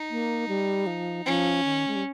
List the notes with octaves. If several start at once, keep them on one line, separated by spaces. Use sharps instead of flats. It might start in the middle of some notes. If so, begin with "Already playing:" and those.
Already playing: D#4
A#3
G3
F3
F3 C#4
D#3
G#3
G3